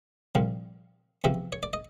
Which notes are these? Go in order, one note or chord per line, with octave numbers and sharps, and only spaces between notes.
C2 A#2 F3
E2 C3 F3 E5
C#5
D5
D#5